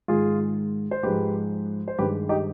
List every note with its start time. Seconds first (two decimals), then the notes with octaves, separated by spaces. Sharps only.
0.08 G#2 D#3 G#3 F4 G#4
0.91 C5
1.03 G#2 F3 G#3 G4 B4
1.88 C5
1.98 G2 D#3 G#3 G4 B4
2.29 D#4 G4